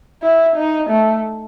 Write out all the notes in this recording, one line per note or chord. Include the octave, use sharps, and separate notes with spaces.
E4
D#4
A3